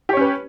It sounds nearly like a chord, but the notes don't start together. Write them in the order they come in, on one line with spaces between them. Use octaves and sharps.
G4 C#5 C#4 B4